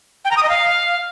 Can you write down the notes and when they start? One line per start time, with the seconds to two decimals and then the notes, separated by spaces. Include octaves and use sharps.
0.25 G5
0.31 A#5
0.37 D#6
0.43 D#5
0.49 F5